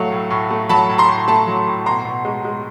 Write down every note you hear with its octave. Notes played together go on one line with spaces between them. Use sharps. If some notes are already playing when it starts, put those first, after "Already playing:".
Already playing: A2 F#3 A3 F5
A2
A2
A3
F#3 A5 B5
A2
A#5 C6
A2
A3 A5 B5
F#3
A2
B2 A#5 C6
B2
G#3
G#3